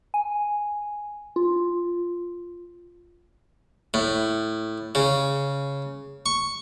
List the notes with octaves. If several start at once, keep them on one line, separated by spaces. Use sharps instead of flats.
G#5
F4
A2
C#3
C#6